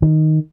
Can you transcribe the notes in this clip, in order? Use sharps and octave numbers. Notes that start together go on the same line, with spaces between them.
D#3